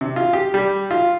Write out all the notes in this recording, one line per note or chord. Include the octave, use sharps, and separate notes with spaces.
C3
F4
G4
G3
F4